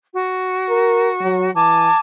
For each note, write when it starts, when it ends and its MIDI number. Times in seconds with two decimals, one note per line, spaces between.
0.13 1.51 66
0.69 1.08 70
1.22 1.49 54
1.56 1.89 52
1.56 2.00 80
1.56 2.00 81
1.56 2.00 86